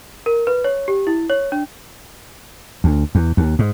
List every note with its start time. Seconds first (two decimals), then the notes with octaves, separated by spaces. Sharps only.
0.26 A#4
0.47 B4
0.64 C#5
0.88 G4
1.07 E4
1.30 C#5
1.52 D4
2.84 D2
3.15 E2
3.37 D#2
3.59 G#2